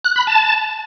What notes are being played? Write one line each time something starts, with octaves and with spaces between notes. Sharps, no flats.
F#6
B5
A5